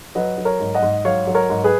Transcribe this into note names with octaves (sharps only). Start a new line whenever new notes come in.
F#3 B4 D#5
F#3
A#4 C#5
G#2
D#5 F#5
G#2
F#3 C#5 F5
F#3
A#4 C#5
G#2
G#4 B4